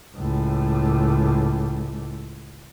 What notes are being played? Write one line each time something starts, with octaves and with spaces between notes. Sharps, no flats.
C#2 A2